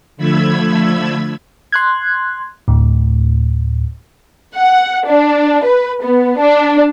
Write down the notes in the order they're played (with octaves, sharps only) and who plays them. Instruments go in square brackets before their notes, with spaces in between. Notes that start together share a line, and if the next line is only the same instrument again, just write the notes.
[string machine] D3 F3 A3 B5 E6 G#6
[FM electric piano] C6 F#6 G#6
D2 A2
[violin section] F#5
D4
B4
B3
D4